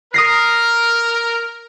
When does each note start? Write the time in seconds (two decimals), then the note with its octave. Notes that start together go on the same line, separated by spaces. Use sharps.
0.14 A#4 D#6 A#6 C7